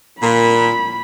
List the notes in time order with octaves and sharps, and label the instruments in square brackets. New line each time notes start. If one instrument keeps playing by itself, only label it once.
[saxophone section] A#2 [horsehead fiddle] B5